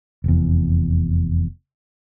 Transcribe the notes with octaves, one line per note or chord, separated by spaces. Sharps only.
F1 E2